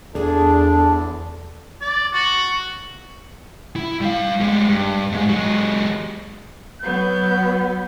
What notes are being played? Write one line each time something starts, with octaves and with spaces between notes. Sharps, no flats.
E2 D4 G#4 A4
D5
F#4
E4
G3 F5
G3 G#3
G2
G#2 G#3
F#3 G#3
F#3 B3 G6